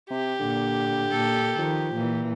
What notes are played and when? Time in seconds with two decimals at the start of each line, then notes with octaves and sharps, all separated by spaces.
0.10 C3 G4
0.40 A#2 D3
1.10 A#2 A4
1.58 D#3 F3
1.94 A#2 E3